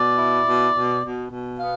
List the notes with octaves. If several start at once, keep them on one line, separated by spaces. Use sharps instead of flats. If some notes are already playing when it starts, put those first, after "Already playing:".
Already playing: B2 D5
E4
B2
B2
B2
B2
B3 F5